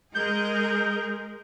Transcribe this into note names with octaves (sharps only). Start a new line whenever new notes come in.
G#3 G#4 A#4 G6